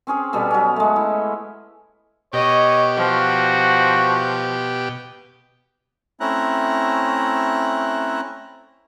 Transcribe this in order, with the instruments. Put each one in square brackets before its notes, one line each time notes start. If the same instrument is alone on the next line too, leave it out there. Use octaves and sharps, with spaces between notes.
[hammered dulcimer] C4 C#4 G#4 C5
B2 G3 B3 A4
F#3 C#4
G#3 A3
E4
[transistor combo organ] B2 G4 [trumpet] C#5 [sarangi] D#5
[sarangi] F3 [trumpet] F#4
[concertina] A3 C4 C#4 E4 A#5 F#6